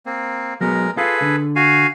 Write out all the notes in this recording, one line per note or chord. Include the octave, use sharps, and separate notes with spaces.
A#3 C4
F#3 G#3 B3 A#4
F4 G#4 A4 B4
D3
F#4 F5 G#5